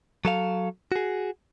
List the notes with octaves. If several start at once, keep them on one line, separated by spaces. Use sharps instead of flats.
F#3 A4 F5
F#4 G#4